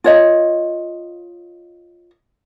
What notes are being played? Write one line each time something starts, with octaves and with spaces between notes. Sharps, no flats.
F4 C#5 D#5